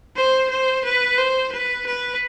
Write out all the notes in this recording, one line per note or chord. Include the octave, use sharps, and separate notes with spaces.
C5
C5
B4
C5
B4
B4